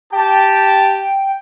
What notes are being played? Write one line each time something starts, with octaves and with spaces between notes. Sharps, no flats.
G4 G5 A5